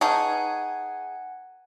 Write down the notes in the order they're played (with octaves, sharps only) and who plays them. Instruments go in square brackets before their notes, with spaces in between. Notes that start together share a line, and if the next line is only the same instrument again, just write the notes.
[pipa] D#4 G#4 [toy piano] B4 A5 C#6 [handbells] F#5 G#5